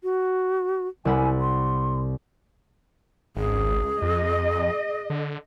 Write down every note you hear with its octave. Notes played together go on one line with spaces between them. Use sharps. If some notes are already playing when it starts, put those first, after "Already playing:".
F#4
C2 F#5 G#5 B5
C6
G#1 C#2 G#4
F2 D#5
D3